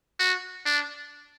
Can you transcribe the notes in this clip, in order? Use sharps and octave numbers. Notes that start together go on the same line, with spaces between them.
F#4
D4